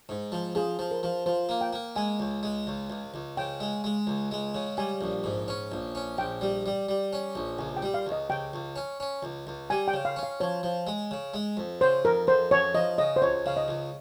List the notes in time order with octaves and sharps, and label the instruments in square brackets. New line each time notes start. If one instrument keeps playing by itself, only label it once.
[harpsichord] G#2
F3
[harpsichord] F3 [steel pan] G#4
[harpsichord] F3
[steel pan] A#4
[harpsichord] F3
[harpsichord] F3 [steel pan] C5
[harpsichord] A#3
[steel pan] G5
[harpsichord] A#3
[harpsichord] G#3 [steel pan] G#5
[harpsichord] C#2
G#3
C#2
C#2
C#2
[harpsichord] C#3 [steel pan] G5
[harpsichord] G#3
G#3
C#2
G#3
C#3
[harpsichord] G3 [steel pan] G#5
[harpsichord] A#1
G#2
C#4
A#1
C#4
[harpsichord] A#1 [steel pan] G5
[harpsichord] G3
G3
G3
C#4
A#1
[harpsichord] C#2 [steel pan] G#5
[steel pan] G5
[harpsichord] G3
[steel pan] F5
[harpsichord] C#2
[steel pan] D#5
[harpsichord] C#2 [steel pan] G5
[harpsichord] C#2
C#4
C#4
C#2
C#2
[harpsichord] G3 [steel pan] G#5
[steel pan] G5
[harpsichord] C#3
[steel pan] F5
[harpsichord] C#4
[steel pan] F5
[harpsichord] F3 [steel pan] C#5
[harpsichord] F3
G#3
C#3
G#3
F2
[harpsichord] C#3 [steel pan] C5
[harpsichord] F2 [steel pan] A#4
[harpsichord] F2 [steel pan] C5
[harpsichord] F2 [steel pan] C#5
[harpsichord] F3 [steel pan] D#5
[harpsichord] C#3 [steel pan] D#5
[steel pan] C5
[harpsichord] C#2 [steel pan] C#5
[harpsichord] C#3 [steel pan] F5
[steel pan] D#5
[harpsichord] C#2